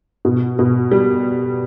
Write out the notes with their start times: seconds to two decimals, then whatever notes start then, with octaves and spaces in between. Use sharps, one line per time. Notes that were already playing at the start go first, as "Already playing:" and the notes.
0.25 B2
0.59 B2
0.92 G3